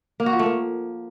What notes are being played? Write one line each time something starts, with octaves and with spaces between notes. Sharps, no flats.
A#3
F#4
F3
A3
A#3